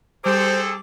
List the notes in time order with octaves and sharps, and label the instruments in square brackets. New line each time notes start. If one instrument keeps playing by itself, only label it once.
[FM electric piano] G3 D6 [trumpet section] C4 G#4 A4 [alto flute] C5